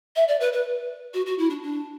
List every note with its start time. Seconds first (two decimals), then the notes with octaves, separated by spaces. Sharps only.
0.16 E5
0.28 D5
0.40 B4
0.53 B4
1.14 F#4
1.26 F#4
1.38 E4
1.50 D4
1.63 D4